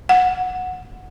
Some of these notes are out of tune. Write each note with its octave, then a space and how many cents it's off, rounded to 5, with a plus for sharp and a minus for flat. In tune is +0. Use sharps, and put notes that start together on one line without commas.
F#5 -10